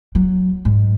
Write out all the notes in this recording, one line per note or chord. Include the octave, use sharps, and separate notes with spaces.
F#3
G#2